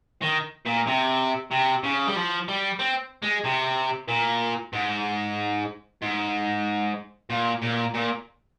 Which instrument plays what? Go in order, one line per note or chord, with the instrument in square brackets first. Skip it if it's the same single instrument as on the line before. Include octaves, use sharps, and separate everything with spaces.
[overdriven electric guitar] D#3
A#2
C3
C3
C#3
G3
F3
G3
C4
G#3
C3
A#2
G#2
G#2
A#2
A#2
A#2